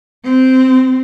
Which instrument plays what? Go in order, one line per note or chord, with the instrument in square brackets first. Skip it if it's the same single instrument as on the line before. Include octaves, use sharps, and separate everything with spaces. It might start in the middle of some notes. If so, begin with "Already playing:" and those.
[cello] C4